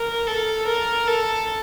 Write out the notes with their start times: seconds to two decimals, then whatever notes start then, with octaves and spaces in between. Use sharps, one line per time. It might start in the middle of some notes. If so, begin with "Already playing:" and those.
Already playing: A#4
0.27 A4
0.67 A#4
1.07 A4